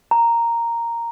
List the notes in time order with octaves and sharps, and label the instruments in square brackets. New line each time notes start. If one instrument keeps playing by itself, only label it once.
[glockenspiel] A#5